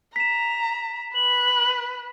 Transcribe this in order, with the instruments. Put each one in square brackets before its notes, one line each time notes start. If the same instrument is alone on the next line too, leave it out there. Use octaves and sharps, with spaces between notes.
[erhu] A#5 [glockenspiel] B6 E7
[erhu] B4 [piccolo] F#7